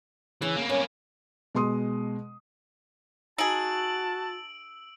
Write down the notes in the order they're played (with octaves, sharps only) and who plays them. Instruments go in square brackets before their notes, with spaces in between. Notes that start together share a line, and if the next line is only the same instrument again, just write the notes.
[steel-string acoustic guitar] C#3 [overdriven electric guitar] E3
[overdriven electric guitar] A#3 B3
[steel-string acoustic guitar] C#4
[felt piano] B2 G#3 C6 D#6
[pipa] D#4 G#4 [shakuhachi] F#4 [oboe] A5 [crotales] E6 D7 F#7